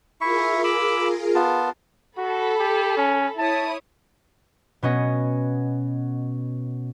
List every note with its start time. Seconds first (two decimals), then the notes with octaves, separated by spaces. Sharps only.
0.21 E4 F4 G#4 A#4 E5 C#6
0.64 B5 D6 E6
1.35 B3 F4 A5
2.18 F#4 A4 B5
2.60 G4
2.97 C#4
3.39 E4 C#5 A5 D#6
4.82 B2 B3 C#4 D#5